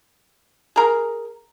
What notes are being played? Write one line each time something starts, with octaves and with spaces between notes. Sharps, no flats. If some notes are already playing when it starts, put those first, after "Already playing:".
G#4 A#4